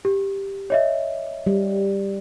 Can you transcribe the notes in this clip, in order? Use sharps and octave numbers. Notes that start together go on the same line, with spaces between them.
G4
C#5 D#5 E5
G3